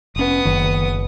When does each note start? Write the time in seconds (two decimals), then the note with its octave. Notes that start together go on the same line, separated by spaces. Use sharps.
0.16 F1 B3 C#4 D#6
0.45 F#1 D#3